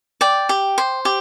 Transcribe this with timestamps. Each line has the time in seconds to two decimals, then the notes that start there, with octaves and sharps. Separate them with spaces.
0.21 D5 G5
0.49 G4
0.78 C5
1.05 G4